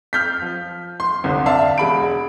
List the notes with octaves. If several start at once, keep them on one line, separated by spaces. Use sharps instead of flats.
F6 G6 B6
F3
C6
G1 C2
D5 E5 F5 A5
E1 G#3 B5 D7